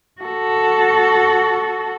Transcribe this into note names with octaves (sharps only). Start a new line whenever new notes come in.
F#4 A4